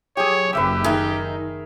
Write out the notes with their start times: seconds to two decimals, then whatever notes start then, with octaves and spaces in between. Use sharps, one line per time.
0.17 F#3 G4 G#4 C#5
0.53 F#1 F#2 G4 B4 E5 E6
0.84 D#3 D#4 G#4 A#4 E5